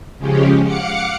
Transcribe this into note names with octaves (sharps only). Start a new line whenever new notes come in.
C#3 F3 G#3 C#4 G4
F5 F#5 D6 C#7